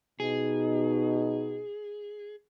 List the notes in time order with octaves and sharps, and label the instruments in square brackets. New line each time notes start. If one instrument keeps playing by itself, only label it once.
[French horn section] B2 D#4 [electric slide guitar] G#4